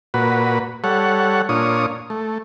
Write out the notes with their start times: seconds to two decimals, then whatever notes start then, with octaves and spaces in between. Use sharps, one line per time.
0.14 A#2 F#4 B4
0.84 G3 A4 C#5 F#5
1.49 A#2 D4 F4 C#5 D#6
2.10 A3